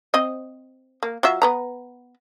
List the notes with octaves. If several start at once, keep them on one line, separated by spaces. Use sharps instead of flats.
C4 D#5
A#3
F#3 F4 E5
B3 B4 A#5